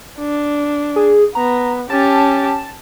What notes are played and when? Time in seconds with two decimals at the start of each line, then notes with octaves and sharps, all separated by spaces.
0.19 D4
0.96 G#4
1.35 B3 A#5
1.90 C#4 G4 A5